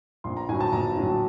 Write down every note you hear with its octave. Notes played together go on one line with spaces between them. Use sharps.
A#1 C6
A#5
A2 F#3 G#5
A5
A#1 A#5
A2 F#3